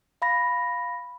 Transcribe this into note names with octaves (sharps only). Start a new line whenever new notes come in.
F5 B5 A#6